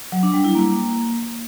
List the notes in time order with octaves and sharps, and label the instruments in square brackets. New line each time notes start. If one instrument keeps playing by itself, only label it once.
[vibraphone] F#3
D4
G3
E4
A#3